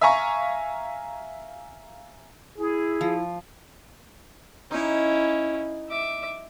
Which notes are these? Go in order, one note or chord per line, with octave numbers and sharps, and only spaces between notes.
E5 F5 G#5 A#5 C#6
E4 G#4
F3
C#4 D#4 E4
E5 D6